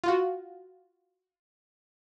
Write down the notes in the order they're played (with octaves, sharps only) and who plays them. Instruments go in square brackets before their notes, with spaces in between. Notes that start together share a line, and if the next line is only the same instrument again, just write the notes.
[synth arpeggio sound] F4 F#4